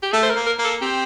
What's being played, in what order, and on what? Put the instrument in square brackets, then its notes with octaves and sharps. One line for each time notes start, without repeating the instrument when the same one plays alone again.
[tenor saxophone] G4
[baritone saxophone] A3 [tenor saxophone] A4
[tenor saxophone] C5
A#4
[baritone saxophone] A#3
[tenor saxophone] A#4
[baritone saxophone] A#3
[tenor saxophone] A4
[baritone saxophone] C4 [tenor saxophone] G4